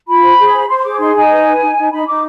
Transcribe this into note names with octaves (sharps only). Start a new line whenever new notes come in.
F4 B5
C5
G#4
C5
C5 C6
C6
G#4 D6
D#4 C6
D#4 G#5
B4
B4
D#4
D#4
D#4 B5
D#4 D6